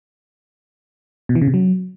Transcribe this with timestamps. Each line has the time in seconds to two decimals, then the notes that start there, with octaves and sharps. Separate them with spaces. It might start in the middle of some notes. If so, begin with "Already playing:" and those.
1.29 B2
1.35 E3
1.42 C#3
1.48 C3
1.54 F#3